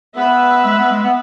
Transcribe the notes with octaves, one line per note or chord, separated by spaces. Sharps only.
B3 B4 E5
G#3
B3
G#3
B3